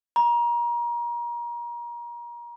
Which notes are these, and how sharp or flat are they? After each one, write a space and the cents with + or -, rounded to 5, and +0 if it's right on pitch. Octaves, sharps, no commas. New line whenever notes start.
A#5 +30